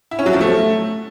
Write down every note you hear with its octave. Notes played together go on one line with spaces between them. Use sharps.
E4
C#4
F#3
F3
A3